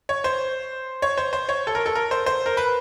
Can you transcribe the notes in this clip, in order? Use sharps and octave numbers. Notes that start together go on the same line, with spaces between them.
C#5
C5
C#5
C5
C5
C#5
A4
A#4
A4
A#4
C5
C5
A#4
B4